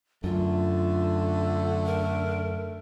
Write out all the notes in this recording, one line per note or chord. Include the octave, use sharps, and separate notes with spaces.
F#2 D3 A3 F4
A#4